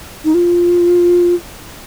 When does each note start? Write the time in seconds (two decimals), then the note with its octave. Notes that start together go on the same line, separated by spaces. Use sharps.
0.24 D#4
0.34 F4